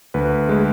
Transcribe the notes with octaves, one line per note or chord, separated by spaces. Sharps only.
D2 B4
G#3